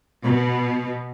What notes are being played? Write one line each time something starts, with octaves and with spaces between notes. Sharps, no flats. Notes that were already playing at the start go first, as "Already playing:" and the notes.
B2